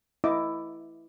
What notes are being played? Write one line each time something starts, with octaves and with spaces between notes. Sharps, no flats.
E4 D#5 D6